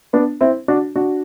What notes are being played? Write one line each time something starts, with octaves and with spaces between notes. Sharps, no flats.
B3 D4
C4 E4
D4 F#4
D4 F#4